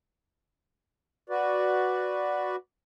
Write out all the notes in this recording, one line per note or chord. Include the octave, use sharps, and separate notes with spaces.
F#4 B4 D5